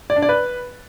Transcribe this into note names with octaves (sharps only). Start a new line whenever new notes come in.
D5
D4
D5
B4